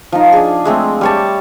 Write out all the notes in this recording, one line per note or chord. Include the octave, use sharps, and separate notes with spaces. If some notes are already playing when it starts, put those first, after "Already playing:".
F3 D#4
D4 G#4
G#3 A3 C4
G3 C#5 A5